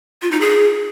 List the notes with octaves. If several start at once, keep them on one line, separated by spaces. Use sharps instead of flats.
F4
D#4
G#4